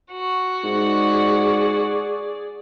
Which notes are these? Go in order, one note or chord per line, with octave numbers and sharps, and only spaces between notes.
F#4
G#2 G#4 D5